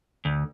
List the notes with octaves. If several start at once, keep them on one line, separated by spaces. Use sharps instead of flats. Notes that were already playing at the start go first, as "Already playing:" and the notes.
D2